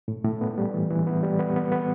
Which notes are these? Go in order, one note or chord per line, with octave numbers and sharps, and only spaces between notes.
A2
A2
B3
G3
E3
E3
B3
G3
B3
B3
B3